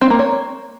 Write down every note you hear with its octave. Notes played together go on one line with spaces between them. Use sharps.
C4
A#3
C#5